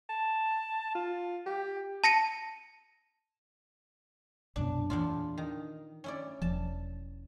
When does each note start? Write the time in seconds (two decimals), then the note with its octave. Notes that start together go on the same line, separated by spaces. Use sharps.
0.10 A5
0.95 F4
1.47 G4
2.04 A5 A#6 C#7 D#7
4.56 C2 F#2 B2 D4
4.90 E2 A#2 D4 F4
5.38 D#3
6.04 C#4 E4 D5
6.42 E1 F3 A5